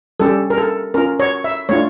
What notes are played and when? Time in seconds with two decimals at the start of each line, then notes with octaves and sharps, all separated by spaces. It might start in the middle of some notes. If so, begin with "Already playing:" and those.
0.20 G3 C#4 G4 A4
0.50 A#4
0.58 A4
0.94 C#4 F4 A#4
1.20 C#5
1.44 E5
1.69 A3 D4 F4 C#5